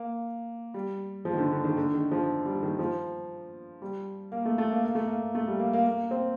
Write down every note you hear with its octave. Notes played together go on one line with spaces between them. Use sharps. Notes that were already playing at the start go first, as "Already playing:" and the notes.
Already playing: A#3
G3
F3
D#3
D3
D3
D#3
D3
D#3
F3
G3
D#3
F3
G3
A#3
A3
A3
A#3
A#3
A3
A#3
A3
G3
A#3
A#3
A#3
C4